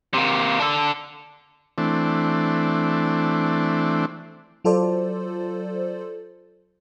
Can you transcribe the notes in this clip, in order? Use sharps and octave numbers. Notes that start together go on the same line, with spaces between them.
C3 A#3
D4 A4
E3 A3 C4 D4
F#3 F4 A4 C5 D5